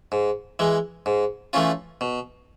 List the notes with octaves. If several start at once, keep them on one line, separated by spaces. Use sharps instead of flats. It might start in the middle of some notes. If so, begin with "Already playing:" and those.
G#2
E3 G#3
G#2
E3 A3 C#4 F4
B2